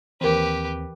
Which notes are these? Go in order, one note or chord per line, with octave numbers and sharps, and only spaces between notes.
D#2 E3 C4 G4 A#4 B4